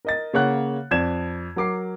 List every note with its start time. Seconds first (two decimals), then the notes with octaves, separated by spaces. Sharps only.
0.05 A#4 D#5 A6
0.33 C#3 A#3 C#5 F#5 F#6
0.91 F2 D5 G#6 E7
1.56 F#3 A#4 D6 C7